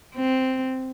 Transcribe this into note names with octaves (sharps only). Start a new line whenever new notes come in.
C4